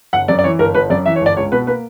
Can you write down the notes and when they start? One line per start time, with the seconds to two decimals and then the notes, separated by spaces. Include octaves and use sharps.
0.13 G1 F#5
0.28 F#2 D5
0.39 D5
0.44 E3 C#5
0.59 G1 A#4
0.74 G1 B4
0.90 F#2 D5
1.06 E3 E5
1.16 C#5
1.21 G1 D5
1.36 C#2 C#5
1.52 B2 B4
1.67 A#3 B4